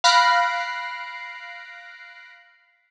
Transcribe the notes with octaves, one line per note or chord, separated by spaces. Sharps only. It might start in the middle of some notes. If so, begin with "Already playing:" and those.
F5 B5 F#6 A#6 C7 D7